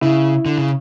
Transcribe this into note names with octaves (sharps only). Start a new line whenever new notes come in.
C#3 E4
D3
C#3